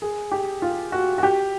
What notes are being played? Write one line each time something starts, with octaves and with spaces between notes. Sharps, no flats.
G#4
G4
F4
F#4
F#4
G4